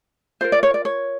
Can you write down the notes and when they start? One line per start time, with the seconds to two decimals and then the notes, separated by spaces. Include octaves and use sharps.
0.41 F4 A#4 C5
0.52 D5
0.63 C#5
0.74 D5
0.85 C#5